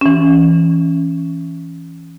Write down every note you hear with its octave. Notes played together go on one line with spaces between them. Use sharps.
E3 C#4